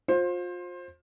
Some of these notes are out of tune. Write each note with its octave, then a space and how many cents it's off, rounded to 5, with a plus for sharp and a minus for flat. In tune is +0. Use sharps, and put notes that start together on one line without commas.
F4 +30 C5 +20